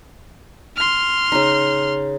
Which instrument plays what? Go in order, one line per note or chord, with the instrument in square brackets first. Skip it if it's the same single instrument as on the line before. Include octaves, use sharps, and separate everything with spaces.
[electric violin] C6 F6
[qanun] C#3 D#4